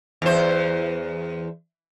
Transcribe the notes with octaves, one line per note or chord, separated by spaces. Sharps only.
E2 C5